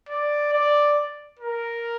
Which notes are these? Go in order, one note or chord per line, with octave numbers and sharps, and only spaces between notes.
D5
D5
A#4